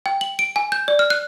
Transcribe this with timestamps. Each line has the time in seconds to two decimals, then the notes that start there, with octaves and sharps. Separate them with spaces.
0.06 G5
0.21 F#7
0.39 D7
0.56 G#5
0.72 G6
0.88 D5
0.99 F6
1.10 F#6